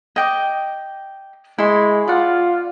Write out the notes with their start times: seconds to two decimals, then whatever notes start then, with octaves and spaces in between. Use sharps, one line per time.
0.16 D#5 G5 D6
1.58 G#3 E4 C6 C#6
2.08 F4 D5 F#5